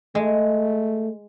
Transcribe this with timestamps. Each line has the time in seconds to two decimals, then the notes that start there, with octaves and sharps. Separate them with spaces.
0.15 G#3 A3